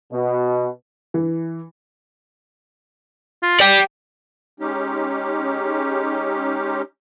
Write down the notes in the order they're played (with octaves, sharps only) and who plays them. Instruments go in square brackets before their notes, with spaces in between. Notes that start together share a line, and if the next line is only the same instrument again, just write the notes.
[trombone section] B2
[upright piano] E3
[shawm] F4
[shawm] G4 [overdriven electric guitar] D5 G5
[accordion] G#3 C#4 D#4 G4